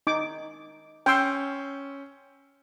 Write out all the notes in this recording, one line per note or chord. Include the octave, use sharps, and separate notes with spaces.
D#4 D6
C#4 G5 C6 E6